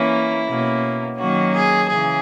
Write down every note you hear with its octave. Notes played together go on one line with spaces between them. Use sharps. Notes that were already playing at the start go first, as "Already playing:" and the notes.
Already playing: E3 A#3 C#4 E4
B2 A#3 C#4
D#3 F#3 A#3 C#4 F#4
G#4
C#3 E3 G#4